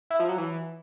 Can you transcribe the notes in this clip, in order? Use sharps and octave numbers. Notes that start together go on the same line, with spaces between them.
E4
F3
F#3
E3